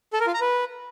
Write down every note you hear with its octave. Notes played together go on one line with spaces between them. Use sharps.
A4
A#4
F4
A#5
B4